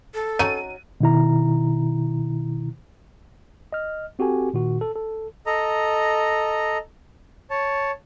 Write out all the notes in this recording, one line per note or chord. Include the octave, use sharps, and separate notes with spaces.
A4
F#3 C#4 D#4 D#7
B2 D#3 E4 A#5
D#5 F6
C4 F#4 G4 A4 G#5
A#2 D#3 F#4
A4
A4
A4 D#5 A#5
C#5 A5